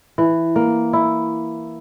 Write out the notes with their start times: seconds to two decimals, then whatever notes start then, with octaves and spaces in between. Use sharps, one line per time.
0.18 E3
0.56 A#3
0.93 E4